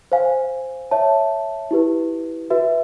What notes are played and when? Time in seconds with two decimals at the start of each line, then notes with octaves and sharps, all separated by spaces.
0.12 C5 F5 G#5
0.91 C#5 E5 A5
1.71 E4 G4 B4
2.50 F#4 B4 E5